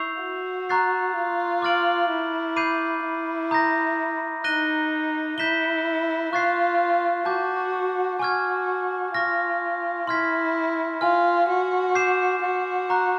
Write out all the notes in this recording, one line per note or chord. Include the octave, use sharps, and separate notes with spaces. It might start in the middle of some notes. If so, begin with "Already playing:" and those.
Already playing: E4 C#6 E6 G6 C7 F7
F#4
A#5 C#6 F#6 A6 C7
F4
D6 F6 A6 D7 F#7
E4
B5 D6 G6 C7 D#7
E4
A#5 D#6 G6 A#6
D#4 F#6 A#6 D#7 G7
E4 G6 B6 E7 G7
F4 C#6 F#6 A6 C7
F#4 A5 D6 G6
F#4 G#5 C#6 F6 G#6
F4 C#6 F6 A#6
E4 C6 F6 G#6 B6
F4 G#5 C6 F6
F#4
D6 G6 C7 E7
F#4
A#5 C#6 F#6